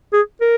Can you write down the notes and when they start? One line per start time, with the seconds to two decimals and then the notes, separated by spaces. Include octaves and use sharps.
0.13 G#4
0.40 A#4